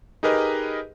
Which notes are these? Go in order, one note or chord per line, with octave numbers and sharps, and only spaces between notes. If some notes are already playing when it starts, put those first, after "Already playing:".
D#4 G4 G#4 A#4 B4 D#5